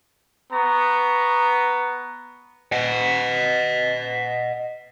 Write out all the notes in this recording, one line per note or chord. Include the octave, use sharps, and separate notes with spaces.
B3 A#5 C#6
D#5 F#5